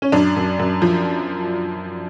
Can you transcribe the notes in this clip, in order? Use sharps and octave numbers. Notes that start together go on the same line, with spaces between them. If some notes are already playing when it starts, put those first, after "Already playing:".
C#4
F#2 D4
F#2
F#2
F3